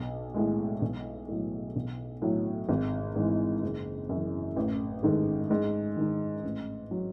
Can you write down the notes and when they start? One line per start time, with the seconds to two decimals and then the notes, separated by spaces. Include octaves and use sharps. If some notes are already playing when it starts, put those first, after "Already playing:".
Already playing: B1
0.34 A2 G#3
0.82 B1
1.28 A2 F#3
1.76 B1
2.22 A2 F#3
2.69 G#1
3.16 G#2 E3 G#3
3.62 F#1
4.09 F#2 E3
4.56 A1
5.03 G#2 D#3 A3
5.51 G#2
5.97 D#3 G#3 D#4
6.43 A1
6.91 F#3